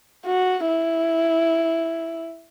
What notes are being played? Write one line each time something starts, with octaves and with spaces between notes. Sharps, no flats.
F#4
E4